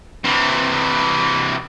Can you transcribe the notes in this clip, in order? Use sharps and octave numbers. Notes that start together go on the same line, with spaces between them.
C3 E3